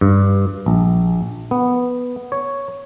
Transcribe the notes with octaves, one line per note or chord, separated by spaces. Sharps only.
G2
A#1
B3
C#5